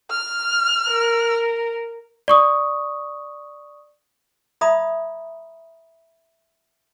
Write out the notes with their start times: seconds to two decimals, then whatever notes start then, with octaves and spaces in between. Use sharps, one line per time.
0.10 F6
0.89 A#4
2.28 D5 C#6 D#6
4.61 D5 E5 A#5 B5 D#6